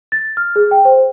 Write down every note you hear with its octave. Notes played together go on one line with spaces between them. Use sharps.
A6
F6
G#4
G5
C5